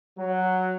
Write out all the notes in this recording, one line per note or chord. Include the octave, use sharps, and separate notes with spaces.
F#3